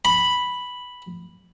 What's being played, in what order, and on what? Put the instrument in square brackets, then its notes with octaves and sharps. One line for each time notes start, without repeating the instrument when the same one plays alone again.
[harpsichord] B5